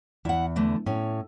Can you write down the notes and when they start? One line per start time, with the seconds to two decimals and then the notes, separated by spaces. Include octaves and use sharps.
0.25 E2 E4 F#5
0.56 D3 E3 A3
0.86 A2 C#4